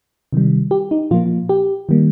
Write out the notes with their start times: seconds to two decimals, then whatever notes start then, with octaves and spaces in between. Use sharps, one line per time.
0.33 C3 D#3 G3
0.71 G4
0.91 D#4
1.11 A#2 F3 A#3 F4
1.49 G4
1.89 D#3 G3 A#3